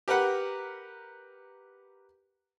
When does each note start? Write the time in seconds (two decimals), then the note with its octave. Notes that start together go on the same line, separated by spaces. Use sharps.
0.08 G4 A#4 B4 F#5